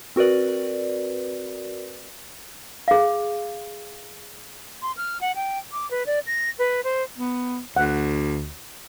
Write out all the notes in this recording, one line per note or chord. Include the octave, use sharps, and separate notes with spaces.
C4 F#4 A#4 B4 D5
G#4 F5
C6
F6
F#5
G5
D6
B4
D5
A#6
B4
C5
B3
D2 F#5